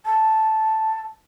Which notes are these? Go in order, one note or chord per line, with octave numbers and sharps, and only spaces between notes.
A5